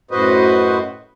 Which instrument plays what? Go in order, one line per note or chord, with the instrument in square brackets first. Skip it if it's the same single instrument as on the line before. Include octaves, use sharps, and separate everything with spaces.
[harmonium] F#2 A2 F#4 B4 C5 D#5